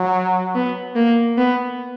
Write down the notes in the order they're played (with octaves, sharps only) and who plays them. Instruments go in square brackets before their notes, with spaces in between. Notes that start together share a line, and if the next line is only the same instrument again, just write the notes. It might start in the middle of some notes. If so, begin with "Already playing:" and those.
Already playing: [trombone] F#3
[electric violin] B3
A#3
B3